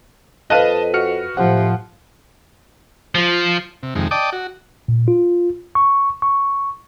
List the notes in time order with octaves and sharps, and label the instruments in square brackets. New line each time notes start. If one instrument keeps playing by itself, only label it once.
[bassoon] F2 [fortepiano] B4 F5 F#6 [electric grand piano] D#5 A5 D#7
[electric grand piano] F#4 F6 C#7
[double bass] A2 F3 [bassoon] C3 [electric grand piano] F#5
[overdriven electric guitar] F3
[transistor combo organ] C3
F2 C3 D#3 G#3
D5 D#5 G5 A5 D6 D#6
F#4
[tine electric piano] A#2
F4
C#6
C#6